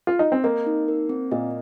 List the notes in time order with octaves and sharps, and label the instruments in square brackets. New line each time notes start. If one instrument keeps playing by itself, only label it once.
[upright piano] F4
D#4
C4
[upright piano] A#3 [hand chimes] D#5
[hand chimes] D#4
A#4
C4
[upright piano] A#2 [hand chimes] D#5